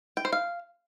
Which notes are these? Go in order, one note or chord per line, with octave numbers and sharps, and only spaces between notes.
G5
C5
F5